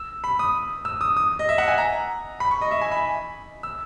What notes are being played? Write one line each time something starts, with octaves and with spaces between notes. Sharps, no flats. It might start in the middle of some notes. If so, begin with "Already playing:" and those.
Already playing: E6
B5
D#6
E6
D#6
D#6
D#5
E5
F#5
G#5
A#5
B5
C#6
D#5
E5
G#5
B5
E6